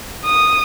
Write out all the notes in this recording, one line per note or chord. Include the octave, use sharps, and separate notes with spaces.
D#6